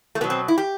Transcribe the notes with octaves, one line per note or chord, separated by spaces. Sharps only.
A3
B2 F#3 B3
C4
E4
G4